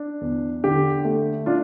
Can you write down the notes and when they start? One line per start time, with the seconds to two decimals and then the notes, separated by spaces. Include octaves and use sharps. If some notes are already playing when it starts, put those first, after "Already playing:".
Already playing: D4
0.21 E2
0.64 D3 G4
1.05 A3
1.46 D4 F4